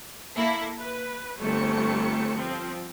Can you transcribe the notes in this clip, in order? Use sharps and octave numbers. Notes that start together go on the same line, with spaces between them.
A#3 E4 A4
B4
G1 A3 C4 C#7
F3 C4